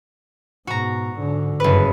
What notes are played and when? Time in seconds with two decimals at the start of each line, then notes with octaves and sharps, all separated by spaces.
0.67 G#2 B2 F#4 A#5
1.15 G#2 D3
1.60 F#1 G2 B4